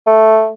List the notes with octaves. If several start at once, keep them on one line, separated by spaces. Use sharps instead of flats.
A3